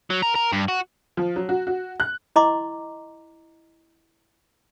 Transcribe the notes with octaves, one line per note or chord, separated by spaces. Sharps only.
F#3
A#4
A#4
G2
F#4
F3
F#3
F#4
F#4
F#6
E4 D#5 A#5 C6 D6